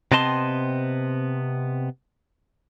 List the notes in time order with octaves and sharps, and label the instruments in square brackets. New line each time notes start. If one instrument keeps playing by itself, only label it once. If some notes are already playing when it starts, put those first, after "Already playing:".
[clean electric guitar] C3 B3 C4 D#5 A5 C6